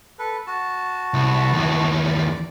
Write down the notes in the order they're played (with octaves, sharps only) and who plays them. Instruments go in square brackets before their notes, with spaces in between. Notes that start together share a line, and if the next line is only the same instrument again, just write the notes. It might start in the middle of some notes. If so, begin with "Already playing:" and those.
[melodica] A4 B4
F#4 A5
[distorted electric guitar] C2
D#2 E3
[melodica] D5